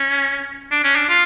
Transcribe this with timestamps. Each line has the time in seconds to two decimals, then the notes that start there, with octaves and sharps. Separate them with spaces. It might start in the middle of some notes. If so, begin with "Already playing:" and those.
Already playing: C#4
0.71 D4
0.84 C#4
0.96 D4
1.09 F4